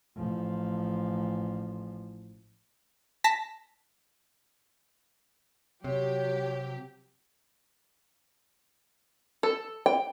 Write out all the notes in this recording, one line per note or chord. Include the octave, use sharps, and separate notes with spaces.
A1 F3
A5 A#6 B6
C3 F#3 G4 C#5
A4
G5